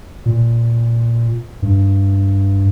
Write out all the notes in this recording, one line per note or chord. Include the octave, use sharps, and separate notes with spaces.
A#2
G2